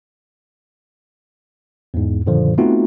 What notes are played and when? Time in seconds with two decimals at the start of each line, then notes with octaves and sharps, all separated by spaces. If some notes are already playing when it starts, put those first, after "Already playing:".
1.94 E2 G#2
2.26 F#2 A#2 D3 D#3 F3
2.58 A3 B3 C4 D#4 F4 F#4